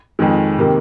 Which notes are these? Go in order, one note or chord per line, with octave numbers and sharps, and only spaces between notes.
F2 D#3 G#3
C3 D#3 A#3